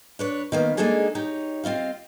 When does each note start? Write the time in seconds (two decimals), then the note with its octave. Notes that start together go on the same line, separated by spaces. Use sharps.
0.19 D4 B4 C#5
0.52 D#3 A#3 B3
0.77 G#3 A#3 D4 D#4 G#4 A4
1.15 D#4 G4 C#5
1.64 C4 F4 D#5 F5